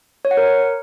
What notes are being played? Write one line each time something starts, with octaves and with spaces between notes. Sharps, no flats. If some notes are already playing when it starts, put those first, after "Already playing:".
C#5
F#5
A#4